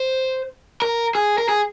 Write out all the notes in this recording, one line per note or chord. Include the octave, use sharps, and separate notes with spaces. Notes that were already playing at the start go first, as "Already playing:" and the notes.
Already playing: C5
A#4
G#4
A#4
G#4